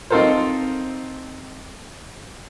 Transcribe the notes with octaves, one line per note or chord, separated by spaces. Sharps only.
C4 D#4 F4 A4 A#4 C5